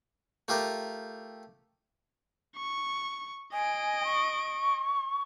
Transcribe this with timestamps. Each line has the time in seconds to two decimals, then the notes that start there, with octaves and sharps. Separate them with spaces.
0.48 A3 F4 G4 A#4
2.56 C#6
3.53 D#5 G#5 D7
4.04 C#6